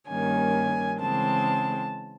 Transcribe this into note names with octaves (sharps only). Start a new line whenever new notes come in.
G2 D#3 G3 A#3 C#4 G#5
C#3 E3 G#3 C4 A5